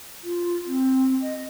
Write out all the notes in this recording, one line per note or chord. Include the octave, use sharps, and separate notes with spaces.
F4
C4
D#5